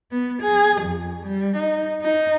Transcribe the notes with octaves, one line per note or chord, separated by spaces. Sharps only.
B3
G#4
F2
G3
D#4
D#4